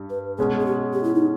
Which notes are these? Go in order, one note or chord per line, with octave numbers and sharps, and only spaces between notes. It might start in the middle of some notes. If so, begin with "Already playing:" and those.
Already playing: G2 G3
B4
B2 G#3 C#4 G#4
G#4
G4
G4
E4
D#4